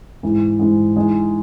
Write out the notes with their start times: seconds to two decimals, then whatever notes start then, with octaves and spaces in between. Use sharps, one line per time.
0.23 G#2 E3 G#3
0.59 G#2 E3 G#3
0.96 E3 G#3 D#4 G#4